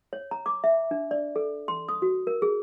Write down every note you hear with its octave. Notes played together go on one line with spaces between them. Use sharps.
C#5
A#5
D6
E5
D4
D5
A4
C6
D#6
F#4
A#4
G#4